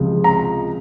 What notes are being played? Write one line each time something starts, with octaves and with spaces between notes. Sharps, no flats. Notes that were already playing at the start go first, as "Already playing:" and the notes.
Already playing: C#2 C3 F3 G#3
A#5